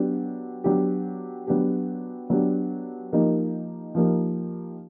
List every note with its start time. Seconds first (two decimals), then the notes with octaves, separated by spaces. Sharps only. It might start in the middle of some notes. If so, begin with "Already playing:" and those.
Already playing: F#3 B3 D4 G4
0.64 F#3 B3 D4 G4
1.47 F#3 B3 D4 G4
2.30 F#3 B3 D4 G4
3.13 F3 A#3 D#4 G4 A#4
3.95 F3 A#3 D#4 G4 A#4